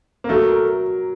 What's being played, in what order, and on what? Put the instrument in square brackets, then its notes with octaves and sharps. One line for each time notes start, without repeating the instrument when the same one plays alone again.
[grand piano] A#3
[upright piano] F#3 [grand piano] A3
[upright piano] A#4